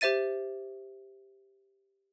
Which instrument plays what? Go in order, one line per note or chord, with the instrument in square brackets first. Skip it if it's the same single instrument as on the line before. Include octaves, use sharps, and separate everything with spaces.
[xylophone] G4 C5 E5 A6 D#7